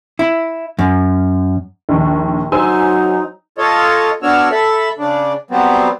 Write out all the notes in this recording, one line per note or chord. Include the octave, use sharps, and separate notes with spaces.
E4
F#2
A#1 D#2
F#3 D#4 C5 G#5 E6
F4 A4 C#5 D#5
B3 D4 F#4 C#5 E6 F6
A4 E5 B5
C#3 D4
F#3 G3 B3 C4